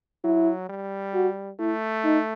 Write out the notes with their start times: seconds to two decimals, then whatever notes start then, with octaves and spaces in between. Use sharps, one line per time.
0.24 F#3 E4
0.69 G3
1.14 F#4
1.59 A3 E4
2.05 D#4